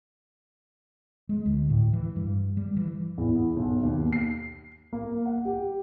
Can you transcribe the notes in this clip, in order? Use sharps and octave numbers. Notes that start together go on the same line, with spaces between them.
G#3
D2
A2
E3
G2
G3
E3
E2
B1
D#2
C7
A#3
F#5
G4